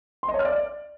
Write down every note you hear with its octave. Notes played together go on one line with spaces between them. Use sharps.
C6
D#5
C#5
F6
D5